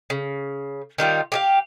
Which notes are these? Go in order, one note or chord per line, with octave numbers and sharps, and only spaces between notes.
C#3
D#3 G3 F4 C5
G4 G#4 F5